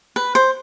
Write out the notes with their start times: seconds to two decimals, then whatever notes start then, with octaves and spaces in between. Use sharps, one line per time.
0.16 B4
0.35 C5